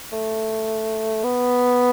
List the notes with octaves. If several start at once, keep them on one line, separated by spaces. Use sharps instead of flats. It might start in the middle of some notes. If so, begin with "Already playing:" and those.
A3
B3